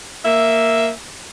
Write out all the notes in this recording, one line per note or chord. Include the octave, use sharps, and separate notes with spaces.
A#3 E5